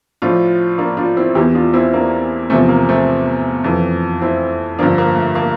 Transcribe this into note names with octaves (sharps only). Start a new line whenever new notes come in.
A2 F3 D4 F4
A#3 D4
D4 F4
C4 E4
E2 E3 E4 G4
D4 F4
C4 E4
A#3 D4
E2 C3 F3 A3 C4
A#3
A3 C4
F2 E3
C4 E4
G2 D3 F3 A#3 D4
A#3
A3
A#3